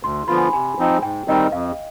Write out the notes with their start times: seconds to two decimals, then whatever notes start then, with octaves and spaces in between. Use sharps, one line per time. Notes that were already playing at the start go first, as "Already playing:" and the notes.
0.03 D2 C6
0.28 D3 F3 B3 F4 B5
0.37 G#5
0.45 B5
0.53 C3 G#5
0.78 F3 C4 D#4
1.02 G#2 G5
1.28 D#3 G3 C4 D#4 D#5
1.52 F2 F5